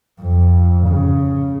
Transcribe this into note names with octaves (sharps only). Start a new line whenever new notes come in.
F2
C#3